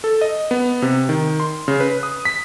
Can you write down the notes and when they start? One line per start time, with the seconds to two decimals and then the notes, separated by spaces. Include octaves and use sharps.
0.04 A4
0.21 D#5
0.51 B3
0.82 C3
1.09 D#3
1.40 C6
1.68 C#3
1.80 B4
2.03 D#6
2.25 B6